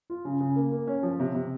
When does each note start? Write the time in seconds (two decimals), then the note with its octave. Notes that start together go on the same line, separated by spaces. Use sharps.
0.10 F4
0.25 C#3
0.40 C#3
0.56 A#3
0.72 A#3
0.87 C#4
1.03 F3
1.20 C3
1.34 C3